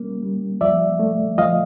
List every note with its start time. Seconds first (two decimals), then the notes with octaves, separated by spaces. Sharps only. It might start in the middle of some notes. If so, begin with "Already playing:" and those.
Already playing: G3 A#3 C#4
0.22 G3
0.61 F3 D5 E5
0.99 A3
1.38 F3 D#5 F5